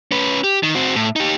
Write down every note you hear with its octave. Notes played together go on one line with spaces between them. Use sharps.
C#4 B4
G4
D#3
C4 F#4
A2
D#4 G4